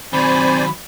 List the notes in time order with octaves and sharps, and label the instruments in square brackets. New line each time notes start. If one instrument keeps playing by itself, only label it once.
[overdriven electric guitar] D#3 F#3 [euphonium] C4 [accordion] C5 D5 G#5 [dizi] B5